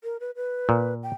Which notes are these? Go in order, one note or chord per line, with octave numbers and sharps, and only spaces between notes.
A#4
B4
B4
A#2
G5